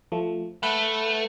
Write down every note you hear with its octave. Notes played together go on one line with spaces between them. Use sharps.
F3 A3
A3 B4 F#5